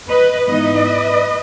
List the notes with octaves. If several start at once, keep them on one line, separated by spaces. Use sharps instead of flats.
B4 D#5
G#2 E3 B3 D#4 B4 D#5